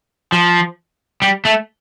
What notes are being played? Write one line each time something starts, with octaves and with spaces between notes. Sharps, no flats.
F3
G3
A3